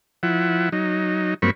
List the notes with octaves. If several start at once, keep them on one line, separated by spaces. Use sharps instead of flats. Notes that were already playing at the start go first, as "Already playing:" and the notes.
F3 E4 F#5
F#3 D#4
G2 F#3 A#3 C4 B5 C#6